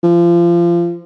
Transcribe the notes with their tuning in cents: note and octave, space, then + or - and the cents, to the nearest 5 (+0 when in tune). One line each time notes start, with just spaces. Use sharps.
F3 -25